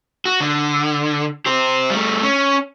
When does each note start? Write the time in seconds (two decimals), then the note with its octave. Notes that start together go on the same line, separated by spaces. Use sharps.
0.25 F#4
0.40 D3
1.46 G4 C5
1.90 G3 A3
2.23 C#4